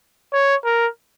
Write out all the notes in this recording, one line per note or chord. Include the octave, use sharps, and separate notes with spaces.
C#5
A#4